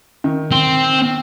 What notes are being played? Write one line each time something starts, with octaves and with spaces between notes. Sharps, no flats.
D#3
C4